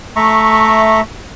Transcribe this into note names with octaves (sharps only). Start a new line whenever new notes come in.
A3 E5 A#5 C#6